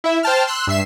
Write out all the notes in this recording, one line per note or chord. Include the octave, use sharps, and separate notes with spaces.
E4 E5
C5 G5 A5 F6
C6 E6 F#6
G2 E5 C7 E7